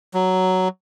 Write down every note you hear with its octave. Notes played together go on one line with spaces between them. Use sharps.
F#3